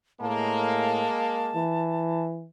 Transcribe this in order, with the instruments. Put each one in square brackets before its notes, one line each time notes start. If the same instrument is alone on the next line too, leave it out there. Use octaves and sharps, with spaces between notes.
[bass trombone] A2 [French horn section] G#3 A#3 [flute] A5
[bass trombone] E3